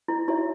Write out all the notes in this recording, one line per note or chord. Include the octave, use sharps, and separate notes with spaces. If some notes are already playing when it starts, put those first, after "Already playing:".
E4
D#4 E4 F#4 C#5 E5